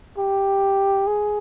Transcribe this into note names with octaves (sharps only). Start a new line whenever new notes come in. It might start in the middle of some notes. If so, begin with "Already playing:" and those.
G4
G#4